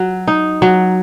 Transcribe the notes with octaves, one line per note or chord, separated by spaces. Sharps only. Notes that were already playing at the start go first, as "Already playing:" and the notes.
Already playing: F#3
D#4
F#3